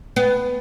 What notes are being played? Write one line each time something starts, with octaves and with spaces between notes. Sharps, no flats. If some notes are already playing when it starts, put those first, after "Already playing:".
B3